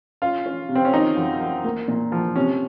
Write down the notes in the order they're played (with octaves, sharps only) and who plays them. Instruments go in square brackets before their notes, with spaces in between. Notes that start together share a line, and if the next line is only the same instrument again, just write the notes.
[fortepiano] C#4 [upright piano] F4
[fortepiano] C#4
C3
[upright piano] C4
C#4
[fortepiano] D#3 [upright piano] D#4
[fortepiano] F#2
F#2
A#3
A#2
F3
[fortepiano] C3 [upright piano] C#4